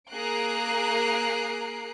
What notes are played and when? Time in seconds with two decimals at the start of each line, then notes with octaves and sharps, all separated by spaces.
0.11 A#3 G#4 A#5 F#6 C7 D7